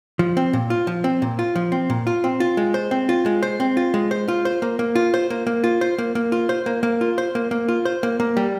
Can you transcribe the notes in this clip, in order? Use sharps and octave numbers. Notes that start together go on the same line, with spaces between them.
F3
C4
A#2
F4
F3
C4
A#2
F4
F3
C4
A#2
F4
C4
F4
G#3
C5
C4
F4
G#3
C5
C4
F4
G#3
C5
F4
C5
A#3
A#3
F4
C5
A#3
A#3
F4
C5
A#3
A#3
F4
C5
A#3
A#3
F4
C5
A#3
A#3
F4
C5
A#3
A#3
G3